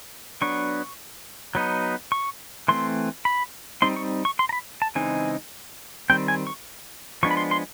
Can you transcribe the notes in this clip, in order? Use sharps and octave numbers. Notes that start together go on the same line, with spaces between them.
F#3 B3 D4 C#6
F#3 B3 D#4
C#6
E3 A3 C4 C6
B5
G3 C4 D#4 C6
C#6
C#6
C6
A#5
B5
A5
C#3 E3 G#3 C4 D#4 G#5
D#3 G3 C4 G5
G#5
C#6
F3 G#3 B3 D4 C#6
B5
C6
C6